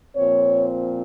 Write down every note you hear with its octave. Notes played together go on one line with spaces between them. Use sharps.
A#2 F3 C4 C#5